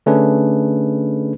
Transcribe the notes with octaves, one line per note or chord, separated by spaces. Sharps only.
D3 A3 C#4 D4 G#4 B4